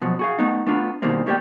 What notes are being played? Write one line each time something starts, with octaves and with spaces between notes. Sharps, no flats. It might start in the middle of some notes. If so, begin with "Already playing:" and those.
B2 F3 F#3
F#4 G#4 F5
A3 B3 D#4
A3 B3 D4 F4
B2 D#3 E3 G3 A#3 C4
A3 A#3 G4 C#5 D5 G5